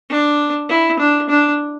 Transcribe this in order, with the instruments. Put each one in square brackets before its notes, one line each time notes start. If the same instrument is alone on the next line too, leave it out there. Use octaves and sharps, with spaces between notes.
[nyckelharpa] D4
E4
D4
D4